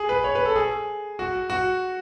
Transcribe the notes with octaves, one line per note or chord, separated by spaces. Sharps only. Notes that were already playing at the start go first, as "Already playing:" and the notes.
Already playing: G#4
B4
C#5
B4
A4
G#4
F#4
F#4